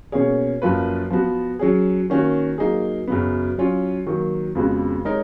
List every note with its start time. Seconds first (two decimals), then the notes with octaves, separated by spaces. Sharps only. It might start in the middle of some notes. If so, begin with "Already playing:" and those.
0.12 B2 A#3 C#4 G#4 C#5
0.62 F#2 F3 A#3 F4 B4
1.10 F3 B3 F#4
1.59 F#3 C#4 G#4
2.10 D#3 A#3 C#4 F#4
2.58 F#3 A#3 D#4 G#4
3.08 F#2 C#3 F#3 B3
3.58 F#3 C#4 F4
4.07 D#3 F#3 A#3
4.55 F2 C#3 G#3 B3 F#4
5.05 G#3 D#4 A#4 C#5